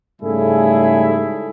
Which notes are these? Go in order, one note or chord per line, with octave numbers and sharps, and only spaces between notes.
G#2 C#3 G3 A3 E4 G#4